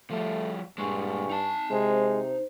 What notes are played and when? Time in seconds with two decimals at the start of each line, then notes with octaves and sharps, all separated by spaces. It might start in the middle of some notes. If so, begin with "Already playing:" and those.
0.10 F3 G3 A3
0.78 G2 A#2 G#3 G#5 C#6
1.30 D#4 A5
1.71 C3 G#3 C5